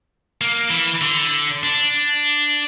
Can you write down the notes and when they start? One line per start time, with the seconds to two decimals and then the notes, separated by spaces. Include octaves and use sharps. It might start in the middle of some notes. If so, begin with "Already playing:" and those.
0.41 A#3
0.70 E3
1.01 D3
1.63 D4